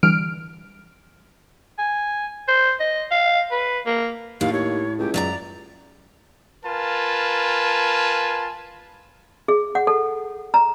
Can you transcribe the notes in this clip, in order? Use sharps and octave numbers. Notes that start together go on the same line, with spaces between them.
D3 E3 G3 F6 D7
G#5
C5
D#5
F5
B4
A#3
D#2 A2 F5
D#2 C#5
C#2 G4
F#2 F#4 D5 A#5
F4 A#4 B4 G#5 A5
G#4
F#5
A4
A#5